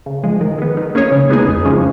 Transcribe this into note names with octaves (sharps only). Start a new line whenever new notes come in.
C#3
F3 G#3
D#3
G#3 B3
D#3
A#3 C#4 G#4 C#5
C#3
G#3 B3 D#4 G#4
F2
C#3 F3 G#3 C#4